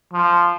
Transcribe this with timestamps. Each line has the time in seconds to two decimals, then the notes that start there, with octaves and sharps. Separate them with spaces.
0.13 F3